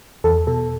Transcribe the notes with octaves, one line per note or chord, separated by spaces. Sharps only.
E2 A4
B2 A4